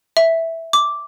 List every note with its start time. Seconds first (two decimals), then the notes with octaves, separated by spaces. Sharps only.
0.17 E5
0.73 D6